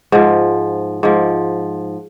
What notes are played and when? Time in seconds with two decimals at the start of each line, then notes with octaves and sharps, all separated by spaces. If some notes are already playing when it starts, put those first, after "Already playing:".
0.12 G#2 F3
1.03 G#2 F3